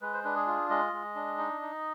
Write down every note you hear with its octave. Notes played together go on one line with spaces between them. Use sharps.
G#3 B4
C5
D4 B4
G#4
F4
G#3 D#5
G#3
D4
D#4
D#4